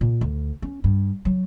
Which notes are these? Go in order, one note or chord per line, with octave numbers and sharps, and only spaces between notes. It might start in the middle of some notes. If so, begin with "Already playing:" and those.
A#2
D2
C#4
G2
F#3